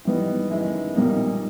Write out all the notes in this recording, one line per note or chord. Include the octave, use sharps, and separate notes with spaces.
A2 E3 G3 B3 D#4
F#2 D#3 G#3 B3 E4
B1 A#2 G3 A#3 D#4